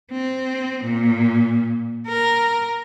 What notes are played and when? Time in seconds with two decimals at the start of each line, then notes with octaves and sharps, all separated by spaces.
0.11 C4
0.84 A#2
2.08 A#4